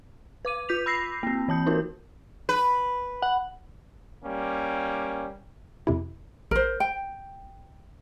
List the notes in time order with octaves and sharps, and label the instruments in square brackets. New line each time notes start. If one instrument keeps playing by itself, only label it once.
[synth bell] B4 D6 D#7
F4 G6 B6 F7
B5 E6 A#6 C7
A#3 C4
E3 A5 G6
D#4 F4 F#4 A#4
[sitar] B4
[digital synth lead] F#5
[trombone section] G3 A#3 C#4
[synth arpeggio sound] F2 C3 E4
[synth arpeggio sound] A1 [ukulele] A#4 C5
[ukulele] G5